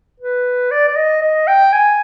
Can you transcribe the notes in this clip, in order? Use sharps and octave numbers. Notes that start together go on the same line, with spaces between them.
B4
D5
D5
D#5
D#5
G5
G#5